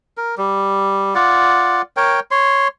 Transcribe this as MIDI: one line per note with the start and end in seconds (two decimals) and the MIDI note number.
0.17 0.35 70
0.38 1.14 55
1.15 1.82 65
1.15 1.82 74
1.15 1.82 78
1.97 2.20 70
1.97 2.20 73
1.97 2.20 79
2.31 2.68 73
2.31 2.68 84